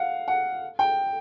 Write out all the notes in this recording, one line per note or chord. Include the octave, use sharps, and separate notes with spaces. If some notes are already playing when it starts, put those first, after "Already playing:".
Already playing: F5 F#5
F#5
G5